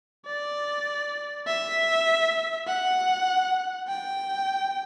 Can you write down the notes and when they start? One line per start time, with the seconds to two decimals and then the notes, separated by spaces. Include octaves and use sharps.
0.26 D5
1.47 E5
2.67 F#5
3.88 G5